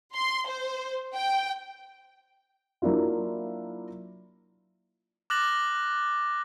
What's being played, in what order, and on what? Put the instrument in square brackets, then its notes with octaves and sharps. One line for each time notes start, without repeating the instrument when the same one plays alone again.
[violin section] C6
C5
G5
[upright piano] F#3 A#3 D4 E4 F4
[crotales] D6 F6 F#6 A6 A#6 F#7